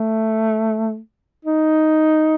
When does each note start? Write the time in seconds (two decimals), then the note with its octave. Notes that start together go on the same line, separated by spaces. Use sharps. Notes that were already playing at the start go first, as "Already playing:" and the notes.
Already playing: A3
1.45 D#4